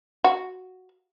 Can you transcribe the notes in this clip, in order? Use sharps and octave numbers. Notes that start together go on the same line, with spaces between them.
F#4